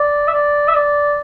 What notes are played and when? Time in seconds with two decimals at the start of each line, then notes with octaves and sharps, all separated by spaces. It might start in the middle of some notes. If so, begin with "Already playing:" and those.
Already playing: D5
0.28 E5
0.33 D5
0.68 E5
0.75 D5